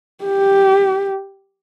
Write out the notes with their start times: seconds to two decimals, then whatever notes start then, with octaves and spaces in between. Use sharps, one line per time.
0.24 G4